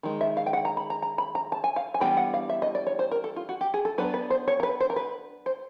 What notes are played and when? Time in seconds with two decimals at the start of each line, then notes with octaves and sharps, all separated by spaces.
0.03 D#3 G#3
0.21 E5
0.37 F5
0.46 G5
0.53 F#5
0.65 A#5
0.77 B5
0.90 A#5
1.02 A#5
1.18 B5
1.35 A#5
1.52 A5
1.64 G#5
1.76 F5
1.94 G#5
2.00 E3 G3 B3 D4 G5
2.17 F#5
2.34 F5
2.50 E5
2.62 D#5
2.75 D5
2.87 C#5
2.99 C5
3.12 A#4
3.24 A4
3.36 F4
3.49 F#4
3.61 G4
3.74 G#4
3.85 A4
3.98 F#3 B3 D4 B4
4.14 B4
4.30 C5
4.48 C#5
4.60 A#4
4.63 B4
4.80 C5
4.90 A#4
4.96 B4
5.46 C5